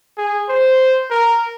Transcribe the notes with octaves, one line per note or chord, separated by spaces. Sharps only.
G#4
C5
A#4